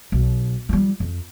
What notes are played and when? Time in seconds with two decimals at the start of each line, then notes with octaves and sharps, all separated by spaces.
0.12 B1
0.69 F3 G3
1.00 F2